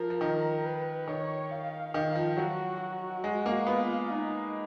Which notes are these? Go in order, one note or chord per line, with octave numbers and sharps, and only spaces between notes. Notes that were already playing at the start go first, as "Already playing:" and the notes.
Already playing: F3 A#4
F3
D#3
B4
D#3 C#5
F5
D#3
F3
F#3 F#4
F#4
G#3
A#3
B3 F4
D#4